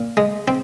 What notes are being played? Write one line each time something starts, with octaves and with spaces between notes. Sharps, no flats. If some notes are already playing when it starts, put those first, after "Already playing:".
Already playing: A#2
G#3
C4